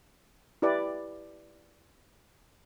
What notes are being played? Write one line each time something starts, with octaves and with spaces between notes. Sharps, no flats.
E4 G4 B4 D5